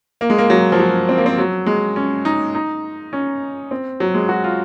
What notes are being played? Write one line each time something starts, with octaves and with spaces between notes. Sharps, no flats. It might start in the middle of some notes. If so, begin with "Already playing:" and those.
A#3
G#3
A#3
F#3
F3
F#3
C4
A#3
C4
F#3
G#3
C#4
D#4
D#4
C#4
C4
F#3
G#3
F#4
F4